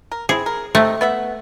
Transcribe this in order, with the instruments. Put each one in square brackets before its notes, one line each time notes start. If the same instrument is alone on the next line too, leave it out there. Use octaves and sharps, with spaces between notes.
[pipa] A#4
[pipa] C4 E4 [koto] G#4
[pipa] A#4
[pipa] C3 C4 D#4 [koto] A3
[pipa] B3 E5 F#5